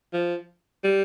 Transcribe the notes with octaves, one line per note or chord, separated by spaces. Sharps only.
F3
G3